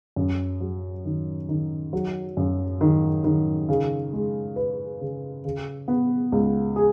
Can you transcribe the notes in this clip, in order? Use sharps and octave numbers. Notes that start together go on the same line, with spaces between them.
F#2
F#3
D#3
D#3
F#3
F#2
D#3
D#3
C#3
G#3
B4
C#3
C#3
B3
C#2
G#4